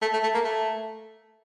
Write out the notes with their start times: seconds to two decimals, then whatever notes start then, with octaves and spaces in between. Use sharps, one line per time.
0.02 A3
0.13 A3
0.23 A3
0.34 A#3
0.45 A3